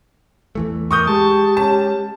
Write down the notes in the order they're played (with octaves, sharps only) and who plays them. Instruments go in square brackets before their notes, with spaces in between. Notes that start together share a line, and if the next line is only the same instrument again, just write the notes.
[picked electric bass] E2 E3 A3
[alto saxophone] A#4 [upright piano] C#6 D#6 G6
[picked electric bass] G#3 [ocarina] G4 [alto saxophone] A5
[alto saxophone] C#4 [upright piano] A5